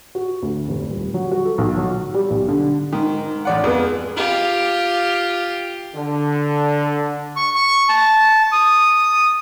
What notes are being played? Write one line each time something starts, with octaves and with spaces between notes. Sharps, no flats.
F#4
D2
F1
D#1
F#3
F#4
A4
B1
F#3
G3
B1
D3
G#2 D#3
A1 D5 F#5
F2 B3 G#4
F4 G4
D3
C#6
C#6
A5
D#6